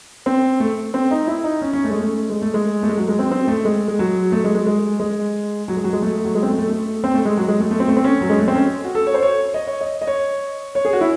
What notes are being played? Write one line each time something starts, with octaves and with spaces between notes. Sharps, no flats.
C4
A3
C4
D#4
E4
D#4
C#4
C#4
A3
G#3
A3
G#3
A3
G#3
A3
G#3
F#3
G#3
C4
C4
A3
G#3
G#3
F#3
A3
G#3
G#3
G#3
G#3
F#3
G#3
F#3
G#3
A3
F#3
G#3
C4
A3
A3
A3
C4
A3
G#3
F#3
G#3
A3
A3
C4
A3
C4
C#4
F#3
G#3
A3
C4
C#4
F#4
A4
C#5
C5
C#5
D#5
C#5
D#5
D#5
C#5
C#5
G#4
F#4
E4